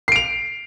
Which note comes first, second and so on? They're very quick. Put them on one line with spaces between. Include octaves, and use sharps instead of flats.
C7 D7 F7